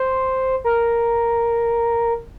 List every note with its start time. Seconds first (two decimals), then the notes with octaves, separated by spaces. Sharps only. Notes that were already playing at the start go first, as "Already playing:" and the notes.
Already playing: C5
0.64 A#4